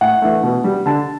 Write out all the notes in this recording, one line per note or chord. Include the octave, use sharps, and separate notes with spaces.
A2 F#5
E3 A3
B2
G3
D3 A5